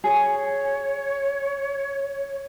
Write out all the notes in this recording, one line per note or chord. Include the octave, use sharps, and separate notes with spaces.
G#4 C#5